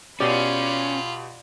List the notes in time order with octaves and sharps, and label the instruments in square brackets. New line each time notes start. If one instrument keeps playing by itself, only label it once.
[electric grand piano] B2 G4 [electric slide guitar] C#4 [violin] F4 B5 [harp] D5 C7